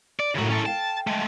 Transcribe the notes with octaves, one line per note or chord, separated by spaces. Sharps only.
D5
F#2 A2 C#3 F#4
C#4 A4
F5 G5 A5
G#3 A3